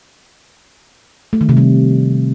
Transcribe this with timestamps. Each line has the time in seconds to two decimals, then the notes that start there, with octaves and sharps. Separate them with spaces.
1.33 A3
1.41 D#3
1.49 C3
1.57 G3